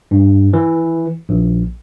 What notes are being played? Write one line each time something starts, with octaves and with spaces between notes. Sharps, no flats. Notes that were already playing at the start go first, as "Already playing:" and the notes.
G2
E3
A#1